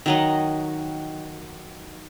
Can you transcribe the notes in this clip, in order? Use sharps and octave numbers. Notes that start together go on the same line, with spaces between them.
D#3 F#3 D#5